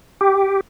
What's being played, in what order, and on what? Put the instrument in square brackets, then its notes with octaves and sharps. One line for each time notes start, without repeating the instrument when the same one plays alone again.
[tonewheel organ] G4